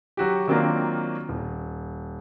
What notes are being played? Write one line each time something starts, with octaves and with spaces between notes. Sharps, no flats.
F#3 F#4 G4
D#3 F#3 A#3 C4 D4 F4
D#1